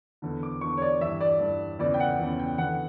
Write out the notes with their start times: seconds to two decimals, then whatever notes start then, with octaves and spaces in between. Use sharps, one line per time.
0.22 E2 D3
0.43 D6
0.61 E2 D3 C#6
0.78 C#5
0.82 D5
1.01 G2 E3 E5
1.21 D5
1.40 G2 E3
1.79 E2 C#3 E3 D5
1.94 G5
2.00 F#5
2.19 E2 C#3 E3
2.39 G5
2.58 E2 D3 F#5